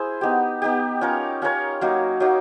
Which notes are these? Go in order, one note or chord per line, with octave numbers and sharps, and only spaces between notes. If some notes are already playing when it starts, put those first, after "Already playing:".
Already playing: E4 G#4 C5
B3 D#4 G4
B3 D#4 G4
C#4 F4 A#4 C#5
C#4 F4 A#4 C#5
F#3 A#3 D#4
F#3 A#3 D#4